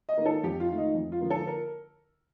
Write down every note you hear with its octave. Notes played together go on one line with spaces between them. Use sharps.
D#5
D#3 A#3
A4
F2 G4
F4
D#3 A3
D#4
F2
F4
D3 F3 A#3
A4
A#4